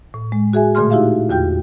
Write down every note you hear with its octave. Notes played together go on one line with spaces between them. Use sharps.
A2
G#3
F#4 G#4 E5 G#5
A#2 D3 A3 G#4 C6 F6
D#4 E4 F#4 G4 E5 F5
E2 D3 F4 F#4 G5 G6